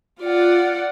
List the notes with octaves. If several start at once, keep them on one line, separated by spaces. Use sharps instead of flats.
F4 D5 F#5